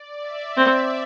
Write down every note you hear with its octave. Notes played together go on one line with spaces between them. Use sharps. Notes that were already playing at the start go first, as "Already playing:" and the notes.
Already playing: D5
E5
C4